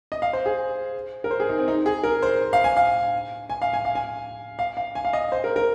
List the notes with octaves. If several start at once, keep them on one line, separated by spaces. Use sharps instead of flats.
D#5
F5
C5
G#4
A#4
C5
G#4
D#4
C4
D#4
G#4
A#4
C5
F5
G#5
F5
G#5
F5
G#5
F5
G#5
F5
F5
G#5
F5
D#5
C5
A#4
A#4